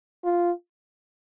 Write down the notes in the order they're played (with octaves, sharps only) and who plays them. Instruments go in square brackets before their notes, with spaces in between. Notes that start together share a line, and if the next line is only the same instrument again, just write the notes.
[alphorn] F4